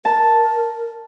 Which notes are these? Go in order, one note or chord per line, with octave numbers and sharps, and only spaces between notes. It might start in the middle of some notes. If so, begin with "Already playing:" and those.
A#4 A5